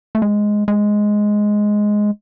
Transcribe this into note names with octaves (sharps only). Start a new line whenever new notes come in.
A3
G#3
G#3